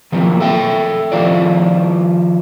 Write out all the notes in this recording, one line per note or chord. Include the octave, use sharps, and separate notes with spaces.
D#3 F3 F#3 A#3 C4
A4 E5 G5
D#3 F3 F4 C5 D5